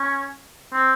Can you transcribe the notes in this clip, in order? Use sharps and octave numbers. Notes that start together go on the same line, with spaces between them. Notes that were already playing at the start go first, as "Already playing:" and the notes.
Already playing: C#4
C4